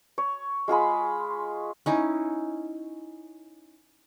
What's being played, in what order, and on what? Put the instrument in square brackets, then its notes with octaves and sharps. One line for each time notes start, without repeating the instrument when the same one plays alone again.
[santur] C#5
G#3 F4 G#4 B5
[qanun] C#4 D#4 E4